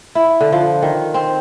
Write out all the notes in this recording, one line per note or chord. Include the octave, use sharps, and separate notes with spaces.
E4
D3
F3
D#3
C4